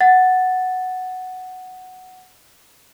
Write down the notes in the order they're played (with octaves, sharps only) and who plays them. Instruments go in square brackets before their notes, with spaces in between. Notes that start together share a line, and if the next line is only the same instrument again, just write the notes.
[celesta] F#5 A6